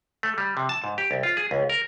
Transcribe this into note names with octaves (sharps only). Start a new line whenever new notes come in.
A3
G3
C3
A5
G#2
G4
C2
F4
G#4
C#2
A#4